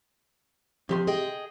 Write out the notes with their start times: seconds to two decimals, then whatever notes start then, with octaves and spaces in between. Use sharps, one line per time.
0.89 C3 F3 G4 C6
1.07 G#4 D#5 G5